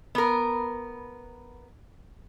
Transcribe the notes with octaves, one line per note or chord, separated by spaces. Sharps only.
B3 A#4